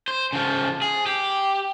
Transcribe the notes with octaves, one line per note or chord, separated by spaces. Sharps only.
C5
C#3 F3
G#4
G4